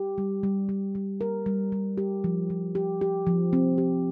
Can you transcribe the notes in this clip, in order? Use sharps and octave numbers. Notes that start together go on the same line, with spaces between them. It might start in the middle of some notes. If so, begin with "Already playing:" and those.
Already playing: G4
G3
G3
G3
G3
A#4
G3
G3
G4
F3
F3
G4
G4
F3
C4
G4